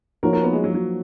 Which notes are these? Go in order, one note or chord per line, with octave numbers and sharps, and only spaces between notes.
F3 A#3 D#4 F#4 A#4 C#5
A#4
B3
G#3
F#3
F#3